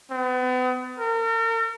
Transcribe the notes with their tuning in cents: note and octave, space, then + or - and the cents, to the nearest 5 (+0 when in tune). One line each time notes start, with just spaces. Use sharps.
B3 +40
A#4 -40